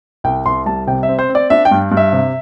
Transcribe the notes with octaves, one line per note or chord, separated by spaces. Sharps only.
C2 G5
C2 C6
G3 A5
C3 G5
E5
C4
C5
C4
D5
D4 E5
G5
G2
G2
E5
C3